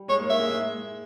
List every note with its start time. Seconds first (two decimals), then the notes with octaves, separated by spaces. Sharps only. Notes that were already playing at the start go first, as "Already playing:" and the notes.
Already playing: G3
0.08 G#3 C#5
0.19 A#3
0.30 A#3 E5
0.40 G#3
0.50 G#3